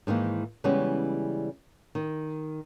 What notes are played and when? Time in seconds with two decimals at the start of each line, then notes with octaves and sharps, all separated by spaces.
0.07 G#2 D#3 E3 A#3
0.64 C#3 E3 G3 G#3 B3 C#4
1.95 D#3